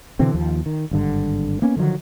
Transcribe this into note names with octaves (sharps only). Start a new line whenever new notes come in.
B2 D3 E3 C4
D#2 F3
D#3
G#1 G2 D3
A#3 B3 C#4
D3 D#3 F3 F#3